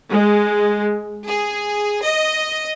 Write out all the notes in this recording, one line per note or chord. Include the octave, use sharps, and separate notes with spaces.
G#3
G#4
D#5